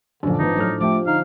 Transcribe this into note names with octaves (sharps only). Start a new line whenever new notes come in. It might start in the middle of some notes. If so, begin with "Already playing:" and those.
A#1 F#2 D3 F3 D4
G#1 E3 B3 D#4
A2 F#3 A4 F6
F3 A3 G4 G5 D6
D3 D#4 F5